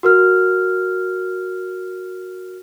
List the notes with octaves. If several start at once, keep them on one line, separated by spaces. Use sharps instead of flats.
F#4 A#4 F6